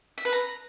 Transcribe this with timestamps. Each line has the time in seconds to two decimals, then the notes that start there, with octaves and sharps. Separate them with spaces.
0.18 E5
0.25 B4
0.32 A#5